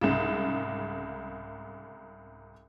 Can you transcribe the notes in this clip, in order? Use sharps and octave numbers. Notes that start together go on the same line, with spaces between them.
C2 G#2 C#3